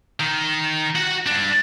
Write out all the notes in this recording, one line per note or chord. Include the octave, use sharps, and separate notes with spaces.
D#3
F#4 F#5
G2 D4